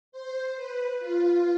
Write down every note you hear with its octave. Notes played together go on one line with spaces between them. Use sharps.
C5
B4
F4